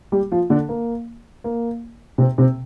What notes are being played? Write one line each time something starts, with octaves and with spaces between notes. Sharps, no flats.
G3 G4
F3 F4
D3 D4
A#3
A#3
C3 C4
C3 C4